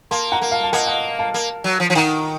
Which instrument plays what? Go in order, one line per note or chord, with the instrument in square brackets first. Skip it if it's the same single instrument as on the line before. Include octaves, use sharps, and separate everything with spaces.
[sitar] A#3 [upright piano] A5 C6
[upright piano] F#5 A#5
[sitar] A#3
[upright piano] F5 A5
A5
[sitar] A#3 [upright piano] D#5 F#5
[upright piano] D#5 F#5
F5 A5
[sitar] A#3
F#3
F3
F3
[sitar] D#3 [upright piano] F#5 A#5